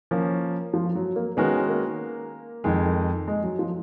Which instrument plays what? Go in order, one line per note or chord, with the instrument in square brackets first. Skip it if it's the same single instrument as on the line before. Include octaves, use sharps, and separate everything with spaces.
[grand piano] F3 A#3 C#4
[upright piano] F3
F#3
A#3
[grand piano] D#3 G#3 C#4 F#4 A#4 [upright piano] B3
[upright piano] A#3
[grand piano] F2 D#3 G#3
[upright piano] G#3
F#3
F3